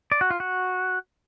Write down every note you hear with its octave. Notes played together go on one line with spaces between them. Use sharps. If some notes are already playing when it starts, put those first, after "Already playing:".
D5
F#4
F4
F#4